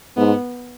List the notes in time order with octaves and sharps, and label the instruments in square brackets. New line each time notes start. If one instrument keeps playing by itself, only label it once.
[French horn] G#2 [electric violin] B3